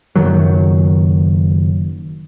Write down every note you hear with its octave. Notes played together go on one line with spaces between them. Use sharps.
F#1 F#2 D#3 F#3